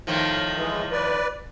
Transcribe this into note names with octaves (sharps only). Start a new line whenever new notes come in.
A2 D#3 F3
E3 G#3
B4 D5